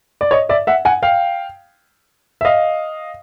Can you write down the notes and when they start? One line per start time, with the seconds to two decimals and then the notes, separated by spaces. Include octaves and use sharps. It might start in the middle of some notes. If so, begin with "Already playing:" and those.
0.21 D5
0.31 C#5 D#5
0.49 D5 E5
0.67 E5 F#5
0.85 F#5 G#5
1.03 F5 G5
2.41 E5
2.45 D#5 F5